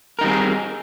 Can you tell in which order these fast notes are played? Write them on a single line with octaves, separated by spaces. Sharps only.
A#4 D#4 G3 C4 G#4